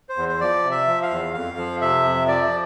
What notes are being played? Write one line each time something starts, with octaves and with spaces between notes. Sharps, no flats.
C5
E2
C5
F3 D5
C3
E5
F3
F5
E2
F2 F5
F3
C3 E5
F2
F3 D5